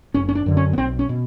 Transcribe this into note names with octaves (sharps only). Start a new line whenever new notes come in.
F#1 C#4
C#4
D4
F#2 D3
C#4
B3
B1 C4
C#4
B2